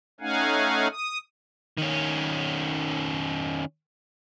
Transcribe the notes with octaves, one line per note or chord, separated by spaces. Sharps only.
A3 C#4 D#4 F5 F#5 G#5
D#6
D#3 C#4